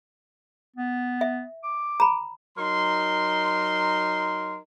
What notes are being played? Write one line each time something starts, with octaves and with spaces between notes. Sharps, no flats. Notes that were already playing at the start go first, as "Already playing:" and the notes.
B3
E5
D6
A#5 B5
F#3 D#4 A#4 C6